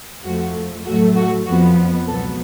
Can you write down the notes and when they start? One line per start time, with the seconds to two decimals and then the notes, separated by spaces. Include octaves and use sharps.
0.24 F2 F3 A3 F#4
0.85 A2 F#3 A3 F#4
1.16 F#4
1.45 F2 F3 B3 F#4
2.07 C#2 B2 F#3 B3 A4